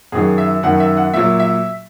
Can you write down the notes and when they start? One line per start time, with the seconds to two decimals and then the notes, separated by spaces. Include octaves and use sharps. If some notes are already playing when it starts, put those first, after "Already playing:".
0.12 F#2 D#3 F#3 G#4
0.38 E5
0.63 F#2 D#3 F#3 F#5
0.80 E5
0.97 F#5
1.14 A#2 F#3 E5
1.40 E5